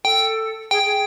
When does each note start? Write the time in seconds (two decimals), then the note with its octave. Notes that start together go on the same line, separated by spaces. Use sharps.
0.05 A4 G5
0.71 G#4 G5
0.86 G#4